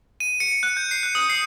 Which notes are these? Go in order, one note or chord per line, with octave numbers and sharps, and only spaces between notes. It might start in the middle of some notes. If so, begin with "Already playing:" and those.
D#7
C#7
F#6
G6
C7
F#6
D#6
C7